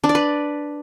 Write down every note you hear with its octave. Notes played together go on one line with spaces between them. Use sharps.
D4
D5
B4